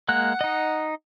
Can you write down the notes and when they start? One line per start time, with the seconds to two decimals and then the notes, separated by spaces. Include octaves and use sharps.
0.09 G#3 A#3 F#5 F#6
0.41 D#4 D#5